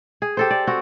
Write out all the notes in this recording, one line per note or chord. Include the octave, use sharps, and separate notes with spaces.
G#4
G4 A4 C5
D5
C4 F#4